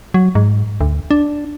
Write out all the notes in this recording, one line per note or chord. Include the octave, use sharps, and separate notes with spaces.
F#3
G#2
D2
D4